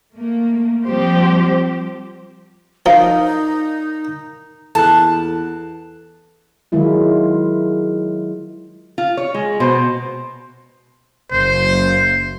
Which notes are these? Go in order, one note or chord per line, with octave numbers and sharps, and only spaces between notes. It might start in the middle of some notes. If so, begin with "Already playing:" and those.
A3 A#3
F3 G3 C4 G4 C5
F3 D#4 A#4 D5 D#5 F5 A#5
E2 A4 A5 F#6
D#3 F#3 G#3 E4 F4
F4
C#5
G#3
B2 C5
F#1 C5